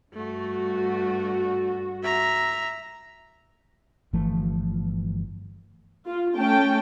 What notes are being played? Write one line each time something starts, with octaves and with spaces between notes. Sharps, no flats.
G2 A3 F#4
E5 A#5
G1 E3 F3 A3
F4
A3 C#4 G5 A5